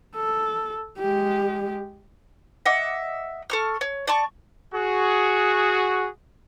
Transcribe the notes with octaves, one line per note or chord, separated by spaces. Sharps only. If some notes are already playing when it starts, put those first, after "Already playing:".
A4
G#3 G4
D#5 E5 F#5 D6
A4 C#6 F6
C#5
D5 A5 C#6
F#4 G#4